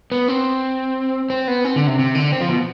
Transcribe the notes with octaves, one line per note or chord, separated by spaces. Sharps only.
B3
C4
C4
B3
C4
D3
C3
C3
D3
C4
F3
B2